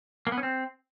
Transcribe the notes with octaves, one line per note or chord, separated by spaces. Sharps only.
A#3
B3
C#4
C4